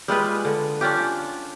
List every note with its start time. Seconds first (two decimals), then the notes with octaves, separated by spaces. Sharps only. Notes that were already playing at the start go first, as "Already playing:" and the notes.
0.08 G3 G#3 F4 B4
0.45 D3
0.81 C#4 D4 F4 G4